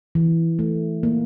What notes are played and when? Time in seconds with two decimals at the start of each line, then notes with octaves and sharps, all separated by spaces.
0.15 E3
0.59 A3
1.03 A#3